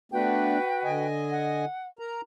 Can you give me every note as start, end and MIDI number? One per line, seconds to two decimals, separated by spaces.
0.12 0.58 57
0.12 0.58 59
0.12 0.58 62
0.12 1.05 66
0.12 1.05 71
0.12 1.05 79
0.84 1.65 50
0.84 1.65 75
0.84 1.65 80
1.32 1.88 78
1.99 2.21 70
1.99 2.21 82